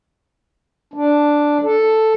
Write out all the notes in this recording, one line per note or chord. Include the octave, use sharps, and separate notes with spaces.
D4
A4